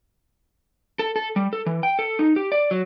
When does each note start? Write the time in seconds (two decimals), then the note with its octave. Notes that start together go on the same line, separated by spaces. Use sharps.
0.99 A4
1.16 A4
1.36 G3
1.53 A4
1.66 E3
1.83 G5
1.99 A4
2.19 D#4
2.36 G4
2.52 D5
2.71 F#3